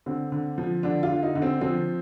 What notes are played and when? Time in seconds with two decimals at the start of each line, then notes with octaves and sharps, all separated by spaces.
0.06 D3 C4
0.32 D3
0.58 F3
0.83 D3 D4
1.03 F4
1.10 D3
1.23 D#4
1.35 D3
1.42 C4
1.61 F3 C4